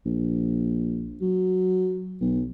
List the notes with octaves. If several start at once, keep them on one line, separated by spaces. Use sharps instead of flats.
A#1
F#3
B1